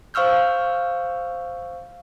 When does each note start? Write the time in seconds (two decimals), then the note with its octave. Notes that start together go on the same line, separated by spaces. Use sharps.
0.14 C5 F5 C#6 E6 F6 G6